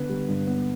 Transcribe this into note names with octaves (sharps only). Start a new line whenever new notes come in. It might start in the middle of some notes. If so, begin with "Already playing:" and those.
Already playing: D3 B3 B4
G3
G2
B3